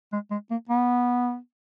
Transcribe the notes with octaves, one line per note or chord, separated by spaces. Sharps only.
G#3
G#3
A#3
B3